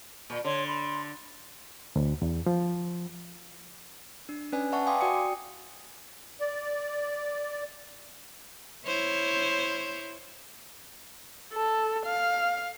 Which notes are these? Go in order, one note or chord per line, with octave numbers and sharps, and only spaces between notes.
A#2
D3 C#5 C6
B5 C6
D2
E2
F3
D4
C#4 B4 D5 G#5
B4 D5 E5 F#5 A5 C#6
F5 G5 G#5 C6 D6 D#6
F#4 D5 G5 D#6 C#7
D5
E4 C5 C#5
A4
F5